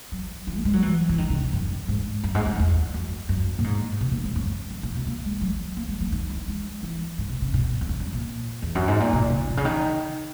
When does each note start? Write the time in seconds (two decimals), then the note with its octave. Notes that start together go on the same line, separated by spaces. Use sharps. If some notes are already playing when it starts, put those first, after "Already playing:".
0.12 F#3
0.47 E3
0.57 A#3
0.65 G#3
0.73 F#3
0.82 E3
1.09 E3
1.18 D#3
1.30 C#3
1.42 B2
1.53 F#2
1.88 G#2
2.24 F#2
2.35 G#2
2.46 F#2
2.59 E2
2.94 F#2
3.29 F#2
3.59 A#2
3.64 G#2
4.01 B2
4.11 A#2
4.24 G#2
4.36 F#2
4.71 F#2
4.83 A#2
4.95 B2
5.07 A#3
5.24 G#3
5.41 F#3
5.77 A#3
5.89 G#3
6.00 F#3
6.12 D#3
6.30 E3
6.48 G#3
6.83 E3
7.18 G#2
7.29 B2
7.42 C#3
7.54 B2
7.81 E2
7.89 F#2
8.00 F#2
8.13 A#2
8.62 E2
8.75 F#2
8.88 G#2
9.00 A#2
9.13 B2
9.30 C#3
9.50 B2
9.57 C#3
9.65 D#3